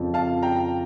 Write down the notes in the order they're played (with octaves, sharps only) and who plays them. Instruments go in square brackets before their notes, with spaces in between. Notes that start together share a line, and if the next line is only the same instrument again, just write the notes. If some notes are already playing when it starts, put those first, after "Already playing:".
Already playing: [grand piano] F2 C#3 F3
[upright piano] F5 A5
G5 A#5